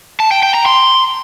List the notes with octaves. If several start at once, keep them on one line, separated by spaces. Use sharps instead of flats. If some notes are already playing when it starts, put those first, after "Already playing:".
A5
G5
G5
A#5
C6